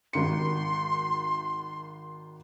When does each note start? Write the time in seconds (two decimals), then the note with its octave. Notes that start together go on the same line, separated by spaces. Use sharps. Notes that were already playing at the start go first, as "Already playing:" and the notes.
0.13 G#1 D#3 C6 C#7